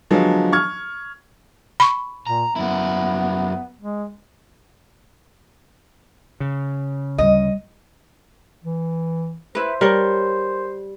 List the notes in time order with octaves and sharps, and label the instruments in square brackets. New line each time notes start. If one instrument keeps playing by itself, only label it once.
[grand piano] D3 F3 F#3 G#3 B3
C#6 F6 G#6
[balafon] B5 C#6
[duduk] A#2 [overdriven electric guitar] A#5
[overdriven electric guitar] F#2 E4 [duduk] B3
[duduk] G#3
[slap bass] C#3
[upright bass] D2 G3 [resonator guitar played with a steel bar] D#5
[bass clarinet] E3
[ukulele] E4 B4 [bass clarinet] C5
[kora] G3 [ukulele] A#4 C#5